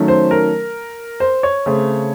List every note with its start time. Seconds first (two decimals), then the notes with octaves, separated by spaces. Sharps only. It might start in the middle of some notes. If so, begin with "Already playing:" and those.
Already playing: D#3 F#3 A3 C#4
0.08 C5
0.31 A#4
1.20 C5
1.43 C#5
1.66 C#3 A3 C4